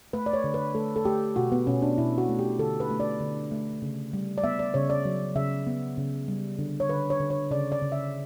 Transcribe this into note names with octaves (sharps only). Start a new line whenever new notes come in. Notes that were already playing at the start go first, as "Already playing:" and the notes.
A3 B4
D5
C#5
D3
B4
A3 A4
A4
A3 G4
B2 F#4
B3
B2 C#4
D4
B2 E4
F#4
A3
G4
D3 A4
B4
A3
D5
D3
A3
C#3
G3
D5
B3 E5
D5
C#3 C#5
D5
F#3
C#3 E5
B3
C#3
G3
D3
C#5
D3 B4
C#5
D3
C#5
C#3 D5
D5
C#3
E5